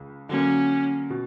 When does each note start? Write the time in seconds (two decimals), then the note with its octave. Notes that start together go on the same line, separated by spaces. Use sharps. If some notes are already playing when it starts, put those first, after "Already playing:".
Already playing: C#2 C#3
0.29 D3 F#3 A#3 C#4
1.10 B2